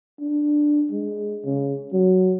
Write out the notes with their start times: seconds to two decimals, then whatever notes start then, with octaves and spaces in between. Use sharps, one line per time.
0.21 D4
0.91 G#3
1.45 C#3
1.93 F#3